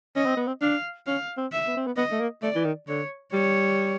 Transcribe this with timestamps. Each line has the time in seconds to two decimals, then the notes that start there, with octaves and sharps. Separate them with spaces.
0.16 C#4 D#5
0.26 C4
0.37 B3
0.47 C4
0.62 D4 F5
1.07 C#4 F5
1.38 C4
1.52 E5
1.67 B3
1.77 C4
1.87 B3
1.97 B3 D#5
2.11 A3
2.20 A#3
2.43 A3 D5
2.55 E3
2.65 D#3
2.88 D3 C#5
3.33 G3 C#5